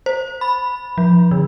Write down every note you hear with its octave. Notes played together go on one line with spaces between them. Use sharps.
C5
B5
F3
D3